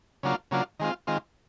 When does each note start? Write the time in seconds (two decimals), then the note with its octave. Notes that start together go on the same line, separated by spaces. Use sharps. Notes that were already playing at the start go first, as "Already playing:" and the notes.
0.23 C#3 F#3 A#3 D4 F4
0.51 C#3 F#3 A#3 D4 F4
0.80 D#3 G#3 C4 F4
1.07 D#3 G#3 C4 F4